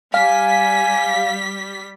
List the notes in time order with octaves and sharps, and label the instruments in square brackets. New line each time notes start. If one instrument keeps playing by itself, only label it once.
[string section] G3 B6 [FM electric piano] F5 [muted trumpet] G#5